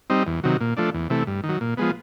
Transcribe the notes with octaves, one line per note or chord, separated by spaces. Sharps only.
G3 C4 D#4
E2
C3 D#3 F#3
A#2
F3 A3 D4
E2
C3 E3 A3
G2
D#3
F#3
A#2
F3 G#3 B3